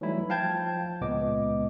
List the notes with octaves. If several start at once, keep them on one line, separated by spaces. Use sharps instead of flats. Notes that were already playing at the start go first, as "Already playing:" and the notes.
E3 F#3 G3 A3 D#4 E4
F3 F5 G5 A5 G6 G#6
C#2 A#2 G#3 B3 D#5 D6